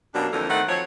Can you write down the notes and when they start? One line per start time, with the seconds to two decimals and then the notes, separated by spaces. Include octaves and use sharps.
0.15 F#2 B2 G3 A#3 D4
0.33 F2 D3 E3 A3 A#3 A4
0.49 D#3 A3 B3 C4 F#5
0.68 F3 F#3 C4 C#5